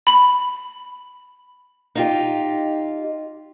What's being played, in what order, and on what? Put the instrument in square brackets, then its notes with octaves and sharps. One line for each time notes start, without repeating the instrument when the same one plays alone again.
[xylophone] B5 F#7
[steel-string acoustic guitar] D#4 F4 G4